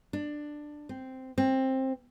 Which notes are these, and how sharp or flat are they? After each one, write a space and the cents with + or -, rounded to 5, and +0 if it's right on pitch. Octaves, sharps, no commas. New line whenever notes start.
D4 +15
C4 -5
C4 +15